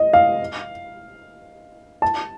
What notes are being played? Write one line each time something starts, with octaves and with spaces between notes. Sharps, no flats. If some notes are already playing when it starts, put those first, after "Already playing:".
Already playing: D#5
F5
A5